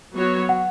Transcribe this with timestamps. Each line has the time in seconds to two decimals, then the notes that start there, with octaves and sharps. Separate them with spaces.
0.15 F#3 B3 F#4 C#5
0.49 F#5